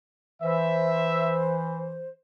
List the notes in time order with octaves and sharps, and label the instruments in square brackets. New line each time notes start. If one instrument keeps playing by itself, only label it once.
[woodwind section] E3 C5 [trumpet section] E5